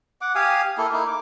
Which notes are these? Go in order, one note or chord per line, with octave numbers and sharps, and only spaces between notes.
F#5 D6
G4 F5 G#5 D#6
A#3 E4 A4
A#3 D#4 E4
D6